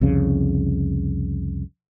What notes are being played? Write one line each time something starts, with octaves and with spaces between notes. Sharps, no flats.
C2 F2 C#3